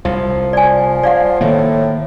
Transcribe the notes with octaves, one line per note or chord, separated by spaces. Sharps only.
C2 F3 E4
D5 G#5
D5 F5 F#5
A2 D#3 A#3